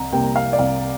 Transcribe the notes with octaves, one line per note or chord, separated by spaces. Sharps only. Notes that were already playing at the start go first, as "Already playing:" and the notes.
Already playing: C2 A#5
C3 G3 A#3 G5
F5
D5
C2 F5